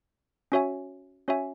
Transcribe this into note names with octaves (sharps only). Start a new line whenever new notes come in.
C#4 F#4 C#5 E5 G#5
C#4 F#4 C#5 E5 G#5